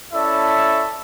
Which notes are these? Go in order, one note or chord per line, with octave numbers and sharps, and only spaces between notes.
C#4 E4 A4 D5 E5 A5